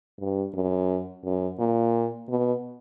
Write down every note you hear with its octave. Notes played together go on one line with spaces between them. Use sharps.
G2
F#2
F#2
A#2
B2